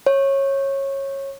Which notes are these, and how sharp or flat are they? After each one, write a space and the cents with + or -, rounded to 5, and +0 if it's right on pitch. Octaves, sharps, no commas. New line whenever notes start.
C#5 -20